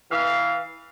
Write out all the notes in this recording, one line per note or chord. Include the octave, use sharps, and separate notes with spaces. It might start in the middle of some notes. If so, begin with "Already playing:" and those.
E3 F5